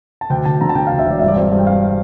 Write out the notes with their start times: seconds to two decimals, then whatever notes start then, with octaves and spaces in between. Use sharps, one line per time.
0.21 A5
0.30 D2 G5
0.45 D2 A5
0.61 D3 A#5
0.69 A5
0.75 D3 G5
0.87 F5
0.92 D2
0.99 E5
1.06 E1 D5
1.19 G2 E5
1.28 D5
1.36 C4
1.51 G2
1.58 G5
1.67 C4 F5